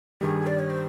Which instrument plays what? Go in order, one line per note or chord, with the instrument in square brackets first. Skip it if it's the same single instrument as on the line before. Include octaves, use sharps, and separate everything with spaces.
[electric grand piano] G2 D#3 G3 [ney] G#4
[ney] D5
C#5
C5